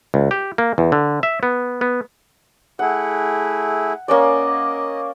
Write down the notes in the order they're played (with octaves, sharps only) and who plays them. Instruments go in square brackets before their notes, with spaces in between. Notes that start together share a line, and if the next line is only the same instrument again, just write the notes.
[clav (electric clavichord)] C#2
G4
A#3
E2
D3
E5
B3
B3
[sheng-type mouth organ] A3 E4 G#4 [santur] F#5
[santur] A#3 C#4 D5 [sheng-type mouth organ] D#5